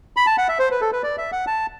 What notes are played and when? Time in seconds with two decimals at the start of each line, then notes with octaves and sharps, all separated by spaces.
0.17 B5
0.27 A5
0.38 F#5
0.49 E5
0.59 C5
0.71 B4
0.81 A4
0.93 B4
1.03 D5
1.18 E5
1.32 F#5
1.47 A5